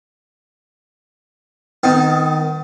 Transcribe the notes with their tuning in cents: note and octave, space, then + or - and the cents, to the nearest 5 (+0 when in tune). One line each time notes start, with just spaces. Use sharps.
D#3 +0 B3 +40